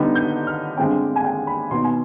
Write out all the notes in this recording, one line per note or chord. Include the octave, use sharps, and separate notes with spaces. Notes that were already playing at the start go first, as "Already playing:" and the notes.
Already playing: D3 G3 B3 D#4
G6
F6
G2 D3 G#3 C4 G5
G#5
G5
B5
B2 B3 D#4 C6
G#5